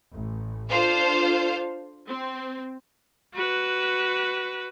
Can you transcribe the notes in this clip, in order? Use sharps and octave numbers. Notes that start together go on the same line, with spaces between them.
A1
D4 F4 A4 C5 F5
C4
F#4 B4